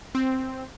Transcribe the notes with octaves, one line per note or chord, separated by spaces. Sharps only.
C4